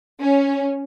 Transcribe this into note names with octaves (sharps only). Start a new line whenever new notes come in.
C#4